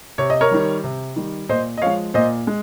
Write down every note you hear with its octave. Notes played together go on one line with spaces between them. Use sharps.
C3 C#5
D#5
A#4 C#5
D#3 G3
C3
D#3 G3
A#2 C5 D#5
D#5
F3 G#3 C#5 F5
A#2 C5 D#5
G#3